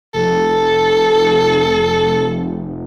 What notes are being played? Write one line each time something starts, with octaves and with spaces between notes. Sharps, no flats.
F1 A4